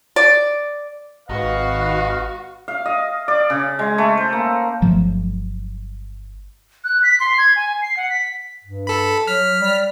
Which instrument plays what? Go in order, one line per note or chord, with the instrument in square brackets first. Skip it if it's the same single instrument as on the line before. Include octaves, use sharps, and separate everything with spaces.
[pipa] D5
[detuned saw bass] G#1 [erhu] F#4 [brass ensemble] B4 F5 [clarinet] D#5
[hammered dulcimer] F5
D#5
D5
C#3
G#3
A3
C5
A#3
[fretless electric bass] G1 F3 F#3 A3
[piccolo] F#6
B6
C6
G#6
G#5
C7
F#5
B6
[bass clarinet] G2
[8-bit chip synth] A4 B5
[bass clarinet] F#3 [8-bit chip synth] F6 B6
[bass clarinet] G3